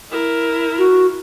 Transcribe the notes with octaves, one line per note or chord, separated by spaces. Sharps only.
E4 A#4
F#4